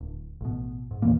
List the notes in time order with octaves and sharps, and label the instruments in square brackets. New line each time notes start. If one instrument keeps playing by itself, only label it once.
[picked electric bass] D1
A1 B2
G#2
E2 A#2 E3 A#3